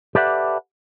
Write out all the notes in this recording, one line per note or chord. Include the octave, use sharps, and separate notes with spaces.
G4 A4 B4 D5 E5 F#5